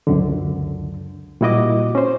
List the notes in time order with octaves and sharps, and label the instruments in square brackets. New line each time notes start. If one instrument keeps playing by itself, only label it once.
[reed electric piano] C#2 F#2 D3
A#2 G3 E4 F#4 D#5 D6
C#4 C5